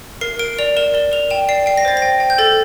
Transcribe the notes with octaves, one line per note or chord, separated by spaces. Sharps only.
A#4 C7
A#4 D7
D5 F7
A#4 E7
D5 G7
A#4 F7
G5 E7
D5 C7
G5 C7
A#6
C5 A6
A#6
G5
G5
G6
A4 A6